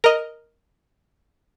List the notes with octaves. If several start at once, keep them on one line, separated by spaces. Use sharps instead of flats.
A#4 D#5